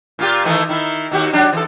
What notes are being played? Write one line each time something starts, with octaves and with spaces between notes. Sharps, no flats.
A#2 F4 G4
D#3 E3 A3
D#3 E4
D#2 F#4 G4
F#3 D4 G4
E3 A4